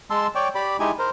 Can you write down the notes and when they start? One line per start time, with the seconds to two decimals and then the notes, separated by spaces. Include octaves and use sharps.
0.10 G#3 A5 C6 E6
0.35 C#5 D5 G5
0.55 G4 D5 B5
0.80 G#3 D#4 E4 G4 G#5
0.99 A#4 C5